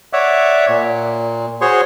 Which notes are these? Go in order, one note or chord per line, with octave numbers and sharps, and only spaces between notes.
C#5 D5 E5 F#5
A#2
F#4 G#4 C5 C#5 C6 C#6